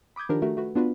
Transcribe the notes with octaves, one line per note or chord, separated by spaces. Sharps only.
B5 D6 D#6 G6 G#6
D#3 F3 D4 F4 G4 A#4
A3 F#4 A#4
A3 F#4 B4
B3 D4 F4 F#4 B4